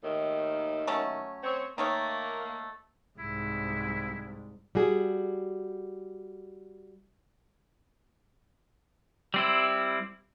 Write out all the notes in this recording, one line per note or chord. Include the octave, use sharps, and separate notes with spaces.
D#2 A2 D#3
F#3 A3 C#4
C4 C#5
D#3 A3 A#3 C#5
C2 G#2 E4
G3 F#4 G#4
G3 C4 E4